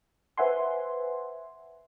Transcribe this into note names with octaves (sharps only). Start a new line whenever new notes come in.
B4 C5 E5 F#5 G#5 C6